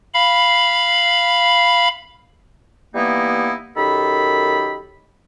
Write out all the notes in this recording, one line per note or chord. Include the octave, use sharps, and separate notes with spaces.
F5 B5
E3 G3 A#3 B3 D#4 E4
F#2 D#3 G4 A4 B5